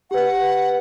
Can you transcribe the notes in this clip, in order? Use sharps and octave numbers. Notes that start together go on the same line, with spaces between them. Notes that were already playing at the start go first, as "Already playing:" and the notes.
G4 B4 F#5